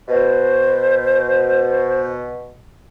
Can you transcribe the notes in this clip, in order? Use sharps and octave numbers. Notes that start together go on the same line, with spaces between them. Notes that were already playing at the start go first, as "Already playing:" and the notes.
B2 C5